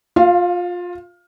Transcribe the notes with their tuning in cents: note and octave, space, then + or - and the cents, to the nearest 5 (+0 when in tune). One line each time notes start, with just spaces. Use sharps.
F4 +20 F5 -15